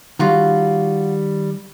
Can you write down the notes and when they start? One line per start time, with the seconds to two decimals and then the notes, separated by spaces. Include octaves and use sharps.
0.19 D#3 G3 F4 F#4 F5